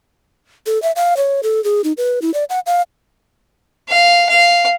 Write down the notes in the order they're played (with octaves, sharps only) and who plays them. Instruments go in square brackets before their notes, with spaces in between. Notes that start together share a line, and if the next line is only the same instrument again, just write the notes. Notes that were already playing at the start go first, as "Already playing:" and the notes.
[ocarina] A4
E5
F5
C#5
A4
G#4
D#4
B4
E4
D5
F#5
F5
[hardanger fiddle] F5
F5